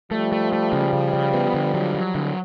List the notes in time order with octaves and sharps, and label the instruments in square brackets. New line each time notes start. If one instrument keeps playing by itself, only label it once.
[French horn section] F3 G3 [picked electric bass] A3
[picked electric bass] A3
A3
C#3
C#3
C#3
B3
D3
F#3
F#3
D3